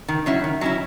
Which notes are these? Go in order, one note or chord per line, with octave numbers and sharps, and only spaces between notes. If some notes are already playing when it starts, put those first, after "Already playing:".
D#3
F#3 C#4 E4
D#3
F#3 C#4 E4